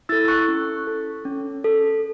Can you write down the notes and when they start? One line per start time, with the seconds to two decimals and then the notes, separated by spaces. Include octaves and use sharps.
0.09 E4 E6 A6
0.12 A4
0.28 C#6 F#6
0.48 C#4
0.87 A4
1.25 C#4
1.64 A4